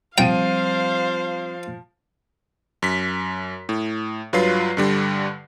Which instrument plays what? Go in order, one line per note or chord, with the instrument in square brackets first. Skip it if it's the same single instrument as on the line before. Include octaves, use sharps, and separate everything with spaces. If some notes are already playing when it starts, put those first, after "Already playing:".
[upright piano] F3 D#7 [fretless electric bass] G3 C4 [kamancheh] C5 F5 [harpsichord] G5
[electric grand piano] F#2 B6
A2
G2 F#3 F4 B4 C7
G2 D3 G3